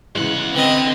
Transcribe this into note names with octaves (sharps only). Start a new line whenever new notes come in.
E2 C#3 E3 G#3 F#5
D3 C4 B4 D#5